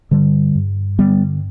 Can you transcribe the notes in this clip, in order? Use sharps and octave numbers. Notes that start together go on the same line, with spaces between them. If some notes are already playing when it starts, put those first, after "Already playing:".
G2 D3 G3
G2
D3 G3 B3